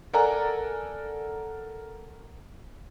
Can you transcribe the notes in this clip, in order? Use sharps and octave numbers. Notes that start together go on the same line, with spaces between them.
A4 A#4 D5 F#5 G#5 A#5